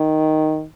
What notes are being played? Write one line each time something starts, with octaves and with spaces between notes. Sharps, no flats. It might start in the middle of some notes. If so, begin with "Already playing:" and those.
Already playing: D#3